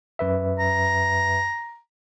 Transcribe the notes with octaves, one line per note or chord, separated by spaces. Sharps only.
F#2 B4 E5
A#5